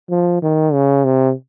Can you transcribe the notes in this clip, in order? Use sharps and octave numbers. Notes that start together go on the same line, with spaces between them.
F3
D#3
C#3
C3